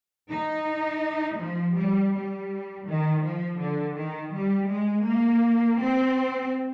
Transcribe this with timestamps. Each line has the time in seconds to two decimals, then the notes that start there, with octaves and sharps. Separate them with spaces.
0.28 D#4
1.38 F3
1.75 G3
2.12 G3
2.86 D#3
3.22 F3
3.59 D3
3.96 D#3
4.33 G3
4.69 G#3
5.06 A#3
5.80 C4